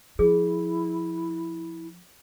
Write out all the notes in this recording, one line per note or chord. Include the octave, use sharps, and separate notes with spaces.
F3 E4 G#4